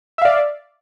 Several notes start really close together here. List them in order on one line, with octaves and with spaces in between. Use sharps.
E5 F5 D5